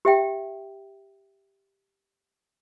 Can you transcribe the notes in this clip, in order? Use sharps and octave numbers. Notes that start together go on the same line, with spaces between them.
G4 E5 G5